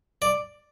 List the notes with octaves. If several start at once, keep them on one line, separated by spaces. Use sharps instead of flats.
D5